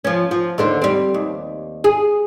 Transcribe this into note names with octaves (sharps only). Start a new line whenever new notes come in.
F3 C#4
F3
D#2 D3 C5
G3 C4
D#2
G#4